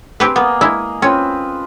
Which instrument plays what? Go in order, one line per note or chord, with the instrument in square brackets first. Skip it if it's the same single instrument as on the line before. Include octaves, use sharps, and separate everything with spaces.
[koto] C4 G4 B4 [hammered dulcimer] G#4
[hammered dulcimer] A#3 D#5 [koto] B3
[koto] G#3 E4
[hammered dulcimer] C4 F4 B4 [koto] C#4